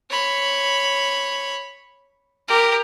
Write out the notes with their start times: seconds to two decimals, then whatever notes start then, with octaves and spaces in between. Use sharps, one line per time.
0.10 C#5 B5
2.48 G4 A#4